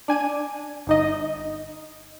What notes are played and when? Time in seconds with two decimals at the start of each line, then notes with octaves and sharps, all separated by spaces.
0.08 D4 G#5 G#6 D#7
0.87 G1 D#4 D#5